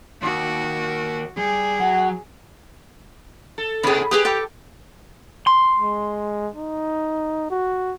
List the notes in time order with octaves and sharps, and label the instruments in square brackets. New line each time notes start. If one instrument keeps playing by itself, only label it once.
[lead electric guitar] D#2 [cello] F#4
[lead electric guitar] G3 [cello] G#4
[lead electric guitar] F#3 [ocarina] F#5
[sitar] A4
[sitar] A2 C3 B3 [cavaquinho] G#4 B5
[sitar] G4 [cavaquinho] G#4 B4 D#6
[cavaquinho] A4 G5 D6
[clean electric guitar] C6
[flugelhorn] G#3
D#4
F#4